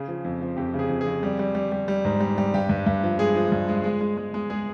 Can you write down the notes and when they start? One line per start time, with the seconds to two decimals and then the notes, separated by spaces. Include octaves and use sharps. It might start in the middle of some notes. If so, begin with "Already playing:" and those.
Already playing: C#3 G#4
0.08 F3
0.25 F2
0.41 F3
0.57 F2 G4
0.74 C#3
0.79 G#4
0.89 F2
1.01 G#4
1.06 F2
1.23 G3
1.39 G3
1.55 G3
1.72 G3
1.88 G3
2.05 G#2
2.20 G3
2.38 G3
2.54 G2 G4
2.69 G2
2.86 G2
3.03 F3
3.19 G#3 G#4
3.36 F3
3.52 G2
3.68 G#3
3.84 G#3
4.01 G#3
4.17 G#3
4.34 G#3
4.50 G#3 G#4